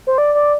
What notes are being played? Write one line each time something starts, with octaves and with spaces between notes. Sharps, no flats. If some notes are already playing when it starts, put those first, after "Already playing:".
C5
D5
D5